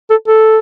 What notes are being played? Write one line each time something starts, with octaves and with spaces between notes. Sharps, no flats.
A4
A4